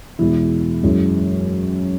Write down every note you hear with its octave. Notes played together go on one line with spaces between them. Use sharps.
E2 B2 G#3 E4
F#2 E3 G#3